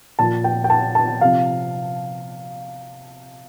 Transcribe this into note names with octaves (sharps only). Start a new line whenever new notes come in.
A#2 F3 A5
G5
G5
A5
A5
C3 F3 F5